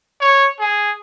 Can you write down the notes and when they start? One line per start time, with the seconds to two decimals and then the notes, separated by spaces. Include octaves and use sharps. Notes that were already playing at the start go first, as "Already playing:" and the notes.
0.20 C#5
0.60 G#4